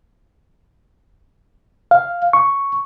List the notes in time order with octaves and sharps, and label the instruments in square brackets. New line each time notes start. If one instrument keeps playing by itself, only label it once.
[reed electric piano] F5
C#6